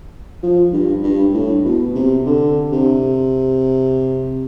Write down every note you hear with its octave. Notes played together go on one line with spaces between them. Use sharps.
F3
G2
G2
A2
B2
C3
D3
C3